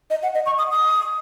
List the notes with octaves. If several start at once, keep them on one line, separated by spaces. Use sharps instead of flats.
D#5
F#5
D#5
C#6
D#6
D#6